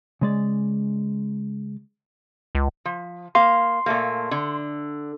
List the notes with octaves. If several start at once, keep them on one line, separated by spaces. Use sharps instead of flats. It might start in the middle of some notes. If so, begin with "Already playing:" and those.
C#3 G#3 D5
C#2
F3
A#3 F5 C6
A#2 A3 A#3
D3